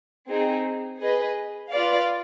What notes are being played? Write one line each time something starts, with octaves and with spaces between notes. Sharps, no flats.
C4 D#4 G#4
G#4 B4 D#5
F4 B4 D5 F5